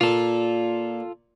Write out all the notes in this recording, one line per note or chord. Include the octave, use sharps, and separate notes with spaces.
A#2 F4 A4